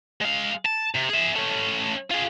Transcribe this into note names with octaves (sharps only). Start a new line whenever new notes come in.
G#3 F5
A5
C3
G#4 E5
A3 C#4
F4 G#4